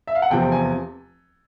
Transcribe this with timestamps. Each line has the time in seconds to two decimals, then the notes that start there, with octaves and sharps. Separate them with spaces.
0.07 E5
0.15 F5
0.22 F#5
0.30 F1 E2 C3 F3 G5
0.52 G#5